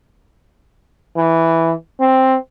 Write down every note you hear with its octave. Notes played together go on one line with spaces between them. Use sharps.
E3
C4